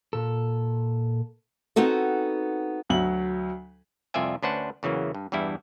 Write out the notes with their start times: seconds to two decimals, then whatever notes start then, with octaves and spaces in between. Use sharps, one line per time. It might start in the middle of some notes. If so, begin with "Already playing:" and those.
0.13 A#2 A4
1.76 B3 C4 D#4 F#4 A4
2.90 D2 F#3 F#7
4.14 C2 F2 F4 D5 E5 G#5
4.43 D2 C#4 D4 B4 C5 F#5
4.83 E2 C#3 E3 F#3 A#3
5.15 G2
5.32 E2 G2 E3 G3 E4